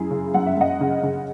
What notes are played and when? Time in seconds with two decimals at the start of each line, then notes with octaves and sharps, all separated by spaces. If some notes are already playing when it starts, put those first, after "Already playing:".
Already playing: F#2 E4 G#4
0.11 C#3
0.34 F#2 F#5
0.46 E5
0.57 F#2 D#5 F#5
0.81 C#3
1.03 C#3